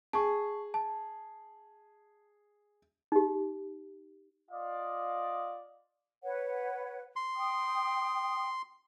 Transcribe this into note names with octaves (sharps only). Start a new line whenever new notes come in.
G#4 A5 C#6
A5
D#4 G4
F4 D5 D#5 F5
B4 C#5 F#5
C6
G5 D#6